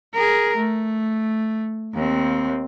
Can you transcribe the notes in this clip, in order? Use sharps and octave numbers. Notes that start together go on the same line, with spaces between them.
G#4 A#4
A3
D#2 C4